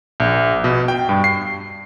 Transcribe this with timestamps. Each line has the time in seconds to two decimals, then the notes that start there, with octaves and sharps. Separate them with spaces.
0.20 A#1
0.64 B2
0.88 G5
1.09 G2
1.24 C7